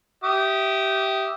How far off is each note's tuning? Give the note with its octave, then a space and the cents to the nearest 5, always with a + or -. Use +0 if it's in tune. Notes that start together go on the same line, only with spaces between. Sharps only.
G4 -15 E5 +0 D#6 +0